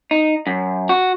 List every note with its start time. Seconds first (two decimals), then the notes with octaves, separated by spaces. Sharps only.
0.11 D#4
0.47 F#2
0.89 F#4